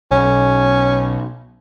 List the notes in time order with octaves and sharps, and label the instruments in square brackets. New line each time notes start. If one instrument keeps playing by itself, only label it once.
[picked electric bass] B1 [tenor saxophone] C#4